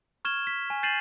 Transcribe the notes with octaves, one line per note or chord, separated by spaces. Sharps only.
C#6 F6 G#6 E7 G7
B6
G#5
G6 A6 C7 D#7 E7 F#7